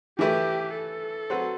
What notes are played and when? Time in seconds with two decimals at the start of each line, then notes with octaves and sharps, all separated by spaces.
0.19 E3 A3 E4 G4 B4
0.75 A4
1.30 F#3 C4 F#4 B4